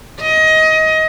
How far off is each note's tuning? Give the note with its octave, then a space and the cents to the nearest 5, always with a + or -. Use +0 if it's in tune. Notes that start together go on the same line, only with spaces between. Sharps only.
D#5 +20